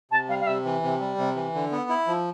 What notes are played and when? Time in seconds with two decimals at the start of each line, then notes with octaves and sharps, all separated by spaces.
0.11 C3 A5
0.29 G3 F5
0.41 F5
0.47 C3 E5
0.65 E3
0.83 C3
1.00 G3
1.18 C3
1.35 E3
1.55 D3
1.71 B3
1.89 E4
2.07 F3